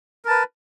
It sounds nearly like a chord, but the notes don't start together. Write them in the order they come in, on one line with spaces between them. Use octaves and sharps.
A#4 A5 B4